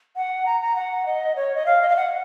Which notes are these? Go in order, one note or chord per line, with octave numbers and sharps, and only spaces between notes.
F#5
A#5
A#5
F#5
D#5
C#5
D#5
F5
D#5
F5
F#5